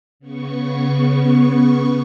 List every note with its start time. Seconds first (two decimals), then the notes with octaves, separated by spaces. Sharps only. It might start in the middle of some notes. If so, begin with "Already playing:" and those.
0.20 C#3 B3 C#6